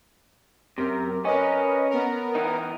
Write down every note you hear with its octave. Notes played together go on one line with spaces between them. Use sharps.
F#2 C3 A#4
C#4 A#4 B4 D#5
B3 A#4
E3 D#4